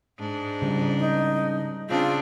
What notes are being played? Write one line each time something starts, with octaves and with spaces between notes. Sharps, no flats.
G#2 D4
C#3 G3
D#4
C#3 C4 D4 F4